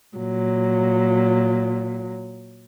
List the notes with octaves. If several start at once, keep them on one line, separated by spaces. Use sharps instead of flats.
A#2 F#3